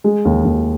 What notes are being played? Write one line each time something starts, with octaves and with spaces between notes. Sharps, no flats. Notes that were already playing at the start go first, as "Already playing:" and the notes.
G#3
D#2
D#2